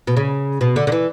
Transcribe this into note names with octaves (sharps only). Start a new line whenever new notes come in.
B2
C#3
B2
D3
D3
E3